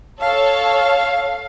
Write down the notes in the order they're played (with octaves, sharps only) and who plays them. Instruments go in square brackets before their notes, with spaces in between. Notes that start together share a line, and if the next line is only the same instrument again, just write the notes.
[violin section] A4 C#5 [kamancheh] F5